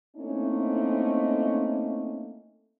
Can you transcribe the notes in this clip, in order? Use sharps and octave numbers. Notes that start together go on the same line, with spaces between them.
A3 A#3 C4 C#4 D#4 E4